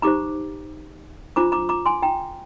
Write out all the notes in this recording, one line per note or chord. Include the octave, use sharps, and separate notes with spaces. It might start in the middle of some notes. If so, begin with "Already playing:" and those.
D#4 G4 C5 A#5 D6
D4 F4 C5 A#5 D6
A#5 D6
A#5 D6
G#5 C6
G5 A#5